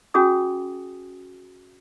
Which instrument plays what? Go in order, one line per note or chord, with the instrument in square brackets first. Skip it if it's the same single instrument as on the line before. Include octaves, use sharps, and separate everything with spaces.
[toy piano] C#4 F#4 G#4 G#5 D#6